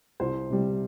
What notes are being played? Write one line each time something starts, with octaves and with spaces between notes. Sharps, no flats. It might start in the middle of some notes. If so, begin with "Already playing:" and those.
C2 C5
C3 G3